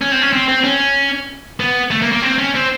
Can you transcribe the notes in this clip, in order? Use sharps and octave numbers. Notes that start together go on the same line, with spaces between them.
C#4
C4
C#4
C4
C4
C#4
B3
A3
A#3
A#3
C4
C#4
C4